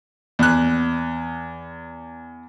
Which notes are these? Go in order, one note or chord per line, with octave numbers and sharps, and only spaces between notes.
E2 F#6